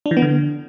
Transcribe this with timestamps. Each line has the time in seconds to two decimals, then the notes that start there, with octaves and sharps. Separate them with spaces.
0.06 D4
0.11 E3
0.17 B3
0.22 D3